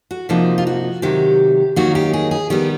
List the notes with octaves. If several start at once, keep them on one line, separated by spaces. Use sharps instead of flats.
F#4
C3 F3 A#3 D#4 F#4
F4
F#4
C3 D#3 F#3 G4
D#3 F#3 A#3 D#4 F#4
G4
G#4
G#4
D#3 G3 B3 G4